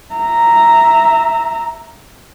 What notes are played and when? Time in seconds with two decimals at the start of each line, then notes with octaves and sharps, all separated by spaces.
0.14 E5 A#5